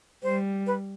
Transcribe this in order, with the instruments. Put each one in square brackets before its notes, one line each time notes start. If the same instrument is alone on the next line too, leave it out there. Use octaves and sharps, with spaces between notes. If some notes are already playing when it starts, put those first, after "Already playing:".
[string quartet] G3 [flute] C5
[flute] B4